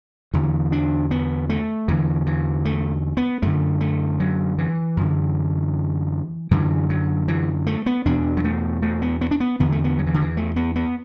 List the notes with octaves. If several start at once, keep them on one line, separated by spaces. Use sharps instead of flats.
E2 D3 E3
D4
B3
A3
E2 D3 E3
E3
A3
B3
F#2 D3 A3
A3
F#3
E3
F#2 D3
F#2 D3 E3
F#3
E3
A3
B3
E2 B2 D4
F#3
A3
A3
B3
B3
D4
B3
E2 D3 B3
A3
B3
F#3
E3
D3
E3
A3
B3
B3